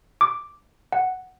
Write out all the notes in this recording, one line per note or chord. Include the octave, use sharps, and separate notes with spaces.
D6
F#5